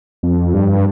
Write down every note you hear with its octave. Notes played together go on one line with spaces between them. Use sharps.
F2
G2